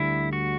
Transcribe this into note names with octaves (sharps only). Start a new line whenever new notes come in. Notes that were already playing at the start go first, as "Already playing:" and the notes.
Already playing: D2 D3 G3 E4
F#4